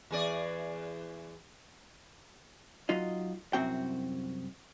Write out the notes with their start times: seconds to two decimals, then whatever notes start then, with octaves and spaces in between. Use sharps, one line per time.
0.11 E2 G#4 D5
2.89 F#3 D#4 F4 D#5
3.53 C2 F#2 C4 F#4 G5